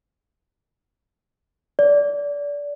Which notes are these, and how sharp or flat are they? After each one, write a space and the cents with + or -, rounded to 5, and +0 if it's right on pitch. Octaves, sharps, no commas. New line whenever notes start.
D5 -25